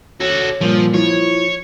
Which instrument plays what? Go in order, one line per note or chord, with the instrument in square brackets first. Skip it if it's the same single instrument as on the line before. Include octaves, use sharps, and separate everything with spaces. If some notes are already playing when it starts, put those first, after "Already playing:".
[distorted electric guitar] F#4 A4 [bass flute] C#5
[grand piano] G2 A#2 [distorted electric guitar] F3
[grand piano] F3 [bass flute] E4 [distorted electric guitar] C#5